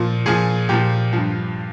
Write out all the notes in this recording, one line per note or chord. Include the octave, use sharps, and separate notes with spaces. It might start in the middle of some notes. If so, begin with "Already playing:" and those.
Already playing: A#2 F3
A#2 F3 G#4
A#2 F3 G4
G2 F3